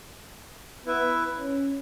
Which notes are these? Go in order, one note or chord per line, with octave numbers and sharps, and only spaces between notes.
B3 E4 B4 E5
C#4